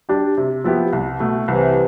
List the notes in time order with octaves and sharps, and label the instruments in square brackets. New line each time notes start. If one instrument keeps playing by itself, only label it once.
[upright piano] G3 D4 G4
C3
F3 B3 E4 G4
C2
B2 A3
[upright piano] C2 [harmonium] C3 E3